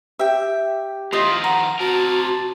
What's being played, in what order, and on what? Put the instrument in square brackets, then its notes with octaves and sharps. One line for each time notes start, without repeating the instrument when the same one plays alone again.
[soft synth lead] G4 [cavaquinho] E5 G5
[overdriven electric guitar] E2 A3 [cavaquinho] F4 D#5 C6 [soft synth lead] A#6
[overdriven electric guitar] D#3 F3
[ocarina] F#5 [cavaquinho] A#5
[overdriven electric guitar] C3 A#4 [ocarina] F#4 [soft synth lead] A5